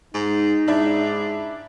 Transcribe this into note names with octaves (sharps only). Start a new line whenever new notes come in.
G#2 D#4
G#2 D4 E4 D5